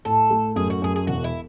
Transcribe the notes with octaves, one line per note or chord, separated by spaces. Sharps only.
A2 A4
A3
F#2 G#4
F#4
F#2 G#4
G#4
E1 F#4
E4